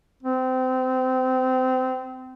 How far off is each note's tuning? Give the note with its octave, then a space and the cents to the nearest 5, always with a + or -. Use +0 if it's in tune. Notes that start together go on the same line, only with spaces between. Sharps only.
C4 -25